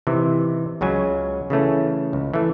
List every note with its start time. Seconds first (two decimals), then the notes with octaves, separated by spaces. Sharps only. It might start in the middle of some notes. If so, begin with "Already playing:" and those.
0.07 C3 D#3 E3
0.81 C#2 C#3 F#3 G#5
1.50 C#3 E3 A3 C#4
2.13 C#2
2.34 E3 A3